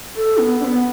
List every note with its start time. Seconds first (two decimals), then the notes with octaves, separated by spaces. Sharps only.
0.16 A4
0.38 B3
0.60 D4
0.65 B3